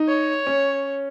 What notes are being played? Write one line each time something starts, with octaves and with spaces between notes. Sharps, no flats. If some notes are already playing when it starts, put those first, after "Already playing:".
Already playing: D#4
C#5
C#4